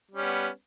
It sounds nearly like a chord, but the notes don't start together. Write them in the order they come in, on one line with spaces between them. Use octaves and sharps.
G3 C#4 B3